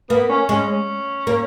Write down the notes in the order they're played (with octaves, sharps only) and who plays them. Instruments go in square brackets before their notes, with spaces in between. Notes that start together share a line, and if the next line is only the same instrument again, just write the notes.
[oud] A#3 [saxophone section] B3
[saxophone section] C#4
[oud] G#3 [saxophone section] C#4
[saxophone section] C#4
[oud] A#3